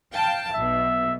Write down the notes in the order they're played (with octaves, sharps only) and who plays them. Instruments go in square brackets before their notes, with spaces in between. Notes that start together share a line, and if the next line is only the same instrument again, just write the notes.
[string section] F5 G5 A5
[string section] B1 B2 [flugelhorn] E5